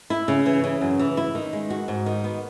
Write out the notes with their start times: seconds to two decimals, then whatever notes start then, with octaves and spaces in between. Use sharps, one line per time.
0.10 E4
0.28 C#3
0.46 E3
0.64 C#3
0.81 F#2
0.99 E3
1.17 E4
1.35 D#3
1.53 G#3
1.70 F#4
1.88 G#2
2.06 D#3
2.24 B3